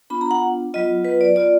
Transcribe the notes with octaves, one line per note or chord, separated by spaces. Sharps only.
B3 D4 F4 B5
A#5
F#5
F#3 B3 F4 D#5
B4
D5
B3 F4 D5